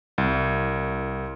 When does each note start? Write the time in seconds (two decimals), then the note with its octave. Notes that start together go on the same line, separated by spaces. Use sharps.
0.18 C2